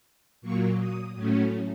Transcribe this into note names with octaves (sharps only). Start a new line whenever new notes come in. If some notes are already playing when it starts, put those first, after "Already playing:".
A#2 F#3 A#3 C#6
D#6
A2 F#3 A3 C#4